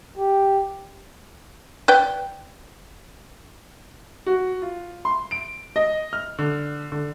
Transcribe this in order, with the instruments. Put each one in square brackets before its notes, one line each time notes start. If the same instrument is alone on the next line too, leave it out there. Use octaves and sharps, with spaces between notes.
[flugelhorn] G4
[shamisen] B4 D5 G5
[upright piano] F#4
F4
C6
D7
D#5
F6
D3
D3